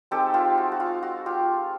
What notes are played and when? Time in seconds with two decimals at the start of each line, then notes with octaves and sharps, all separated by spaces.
0.11 G#3 C4 D#4 G4 A4
0.34 F4 G4
0.58 F#4
0.72 F#4
0.80 F4
1.03 F#4
1.26 F4 G4